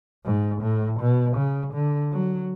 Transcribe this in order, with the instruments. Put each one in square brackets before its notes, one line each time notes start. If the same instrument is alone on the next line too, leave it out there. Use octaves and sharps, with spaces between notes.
[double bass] G#2
A2
B2
C#3
D3
F#3